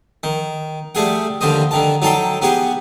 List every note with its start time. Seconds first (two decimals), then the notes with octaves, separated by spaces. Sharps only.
0.23 D#3
0.95 G3 A3 G#4 F#5
1.41 D#2 D3 G3 C5 D#5
1.71 D3 D#3 A5
2.02 F#3 D#4 A4 G5 C6
2.42 B3 G4 G#4 F#5